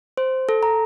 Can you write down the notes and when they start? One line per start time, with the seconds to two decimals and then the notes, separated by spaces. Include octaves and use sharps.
0.17 C5
0.49 A4
0.63 A#5